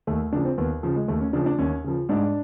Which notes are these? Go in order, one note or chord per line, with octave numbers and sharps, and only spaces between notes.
D#2 A3
C#3 F3 D4
C4
D#2 B3
C#3 F3
G#3
D#2 A3
C#4
C#3 F3 D4
D4
D#2 C#4
C#3 F3
G#2 D4